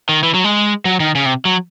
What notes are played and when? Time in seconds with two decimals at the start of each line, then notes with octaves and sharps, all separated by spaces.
0.09 D#3
0.23 E3
0.34 F#3
0.44 G#3
0.85 F#3
1.00 D#3
1.15 C#3
1.26 C3
1.45 F#3